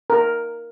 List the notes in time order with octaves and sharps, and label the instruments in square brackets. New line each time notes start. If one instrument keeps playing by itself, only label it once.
[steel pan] A#4